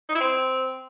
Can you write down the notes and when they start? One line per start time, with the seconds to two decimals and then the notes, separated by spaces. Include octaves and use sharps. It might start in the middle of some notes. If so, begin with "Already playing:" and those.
0.09 D#4
0.15 E4
0.20 C4